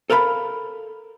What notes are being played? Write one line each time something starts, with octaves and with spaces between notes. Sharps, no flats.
A4 A#4 F5 G#5 B5